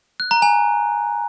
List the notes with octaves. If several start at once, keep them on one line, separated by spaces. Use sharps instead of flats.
F#6
A#5
G#5